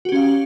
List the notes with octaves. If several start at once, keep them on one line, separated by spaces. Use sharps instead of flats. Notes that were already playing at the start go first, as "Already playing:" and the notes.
C#4 F#4 G4 F5